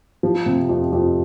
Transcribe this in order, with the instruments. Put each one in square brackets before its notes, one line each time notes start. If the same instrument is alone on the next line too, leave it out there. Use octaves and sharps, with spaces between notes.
[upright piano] F3
C3
F2
F2